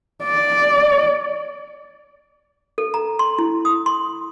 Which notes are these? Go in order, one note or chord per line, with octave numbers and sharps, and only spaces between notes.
D5
A4
A#5
C6
E4
D#6
C6